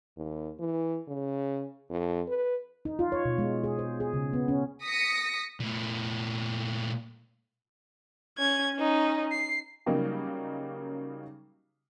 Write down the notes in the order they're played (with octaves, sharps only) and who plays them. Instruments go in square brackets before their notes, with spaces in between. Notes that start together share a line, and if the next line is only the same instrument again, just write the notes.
[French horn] D#2
E3
C#3
F2
B4
[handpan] D#4
F4
C#5
B2
G#3
G#4
C5
G#4
C#3
B3
C#4
[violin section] D#6 A#6 B6 C#7
[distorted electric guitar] A#2 A3
[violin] C#4 G#6
C#4 D#4
C7
[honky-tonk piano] C#3 F#3 G3 A#3 D#4 G4